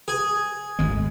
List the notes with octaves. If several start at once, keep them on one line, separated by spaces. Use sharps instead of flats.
G#4
G#1 D2 G#3